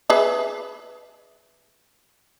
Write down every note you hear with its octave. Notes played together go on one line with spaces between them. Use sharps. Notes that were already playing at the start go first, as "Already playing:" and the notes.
G#4 B4 E5